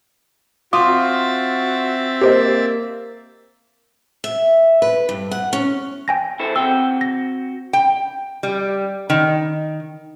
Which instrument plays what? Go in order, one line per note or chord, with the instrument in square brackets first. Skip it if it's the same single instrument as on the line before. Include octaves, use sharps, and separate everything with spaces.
[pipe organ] C4 E5 A6 [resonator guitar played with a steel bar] F4 [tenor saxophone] F#4 [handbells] D6 D#6
[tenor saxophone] A#3 [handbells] G4 C5 D#5
[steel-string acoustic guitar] E5
B4
G2
F#5
C#4
[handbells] G5 G#5 A#6
[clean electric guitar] E4 A4 C5
[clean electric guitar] C4 F#4 G5 [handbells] E6
[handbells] A#6
[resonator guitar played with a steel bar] G5
G3
D#3